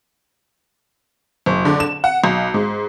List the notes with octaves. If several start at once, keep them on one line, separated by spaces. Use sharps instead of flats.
F#1
D3
E7
F#5
B1
G#2